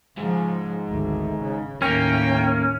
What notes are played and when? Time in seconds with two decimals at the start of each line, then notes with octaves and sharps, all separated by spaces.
0.18 G#2 C#3 F3
0.90 G#1 D2
1.42 C#3
1.82 D#2 A2 A#3 C#4 G5